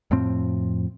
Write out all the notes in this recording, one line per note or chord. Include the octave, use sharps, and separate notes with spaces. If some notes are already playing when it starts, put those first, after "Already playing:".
F2 A2 F3 C4